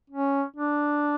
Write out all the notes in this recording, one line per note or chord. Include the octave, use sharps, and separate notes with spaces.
C#4
D4